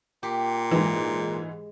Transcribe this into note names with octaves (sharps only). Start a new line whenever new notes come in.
A#2 G4
G#2 E3 G#3